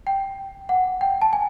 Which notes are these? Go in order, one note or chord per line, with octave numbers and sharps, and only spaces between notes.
G5
F#5
G5
A5
G#5